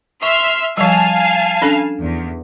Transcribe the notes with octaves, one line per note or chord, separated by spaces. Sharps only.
E5 C6 C#6 F6
F3 G3 F5 G#5 A5
C#4 D4 A4
E2